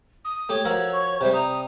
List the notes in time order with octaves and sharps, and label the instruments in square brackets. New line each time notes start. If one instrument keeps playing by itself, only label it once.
[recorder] D#6
[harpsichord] A3 G4 [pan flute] C#5
[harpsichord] F3 F#4 A#4 [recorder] E6
[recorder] C#6
[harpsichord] C3 G3 [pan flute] C5 [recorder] E5
[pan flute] A#5 [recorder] D#6